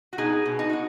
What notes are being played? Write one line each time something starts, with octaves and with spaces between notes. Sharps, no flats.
F#4
B2 D#4 G#4
B2
D#4
D#4 F#4